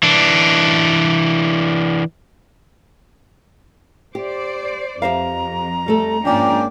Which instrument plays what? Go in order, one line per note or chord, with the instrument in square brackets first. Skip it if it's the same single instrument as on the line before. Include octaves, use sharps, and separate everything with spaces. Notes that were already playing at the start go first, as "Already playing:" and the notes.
[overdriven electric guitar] E3 D4
[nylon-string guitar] G4 [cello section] C5 D5
[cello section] F2 [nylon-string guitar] G4 C5 F5 [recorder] A#5
[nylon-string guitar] G3 A3 A4
[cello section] G#2 A#3 D4 [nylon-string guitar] F3 [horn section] C#4 D5 G5